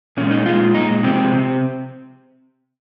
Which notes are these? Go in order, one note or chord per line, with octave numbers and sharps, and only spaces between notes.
A#2 G#3 C#4
D#4
A#2 G#3 F4
A#2 G#3 D#4
C3 F3 G#3 C4
C3